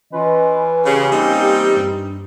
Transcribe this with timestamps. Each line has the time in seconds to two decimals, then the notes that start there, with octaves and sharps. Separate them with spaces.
0.12 E3 C#4 F4 B4 D#5
0.85 C#3 G4
1.12 G3 A#3 C4 D#4
1.76 G2